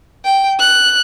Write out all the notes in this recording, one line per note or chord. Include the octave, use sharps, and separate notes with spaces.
G5
F#6